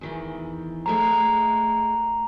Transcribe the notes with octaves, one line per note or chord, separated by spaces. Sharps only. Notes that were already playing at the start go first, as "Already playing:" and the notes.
E2 D#3 E3
G#3 A3 C5 A#5